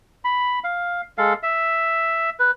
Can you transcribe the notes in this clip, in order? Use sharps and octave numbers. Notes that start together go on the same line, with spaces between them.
B5
F5
G#3 A4 F5
E5
B4